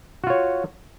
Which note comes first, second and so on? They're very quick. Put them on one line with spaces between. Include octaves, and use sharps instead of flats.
F#4 F4 C#5